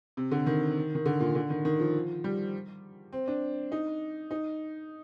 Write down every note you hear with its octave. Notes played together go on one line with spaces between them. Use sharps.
C3
D3
D#3
D#3
D3
A#2
D3
D#3
D#3
F3
G3
C4
D4
D#4
D#4